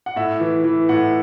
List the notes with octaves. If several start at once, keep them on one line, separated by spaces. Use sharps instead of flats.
F#5
A2 E5
E3
E3
A2 F#5